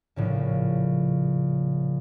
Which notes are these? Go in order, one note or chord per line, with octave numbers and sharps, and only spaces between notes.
A#1 A2 C#3